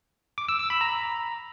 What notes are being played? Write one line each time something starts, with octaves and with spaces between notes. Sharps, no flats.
D6
E6
E6
B5
A#5